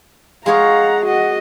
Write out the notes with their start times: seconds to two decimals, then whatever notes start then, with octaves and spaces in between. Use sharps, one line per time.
0.46 G#3 G#4 C#5 F5 F#5 A#5
1.05 F#4 D#5 F#5